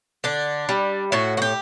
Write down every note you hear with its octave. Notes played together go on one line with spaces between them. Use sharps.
D3 D4
G3
A2 F#4
F#4
G4